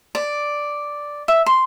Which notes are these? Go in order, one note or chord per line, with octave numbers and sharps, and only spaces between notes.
D5
E5
C6